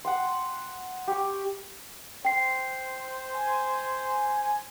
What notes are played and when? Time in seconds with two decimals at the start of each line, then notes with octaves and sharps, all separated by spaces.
0.05 F#5 G5 C6
1.08 G4 C#6
2.25 C5 G5 C7
3.33 G#5